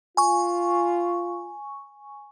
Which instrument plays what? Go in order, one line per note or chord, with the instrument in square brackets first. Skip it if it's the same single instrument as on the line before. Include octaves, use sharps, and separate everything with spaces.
[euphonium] F4 [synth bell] G#5 C#6